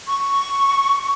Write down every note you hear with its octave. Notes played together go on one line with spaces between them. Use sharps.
C#6